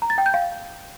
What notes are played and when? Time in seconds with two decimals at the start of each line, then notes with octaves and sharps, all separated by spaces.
0.02 A#5
0.10 A6
0.18 G5
0.26 G6
0.34 F5